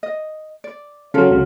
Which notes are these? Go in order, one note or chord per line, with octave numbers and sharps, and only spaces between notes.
D#5
D5
C#3 F#3 F4 A4 A#4
C#2 C#3 F#3